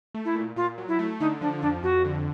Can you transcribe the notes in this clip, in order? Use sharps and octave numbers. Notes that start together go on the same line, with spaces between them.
A3
E4
A#2
A#2 F4
F#3
E4
A3
D3 D#4
F3 D4
F2 D4
F2 F#4
D3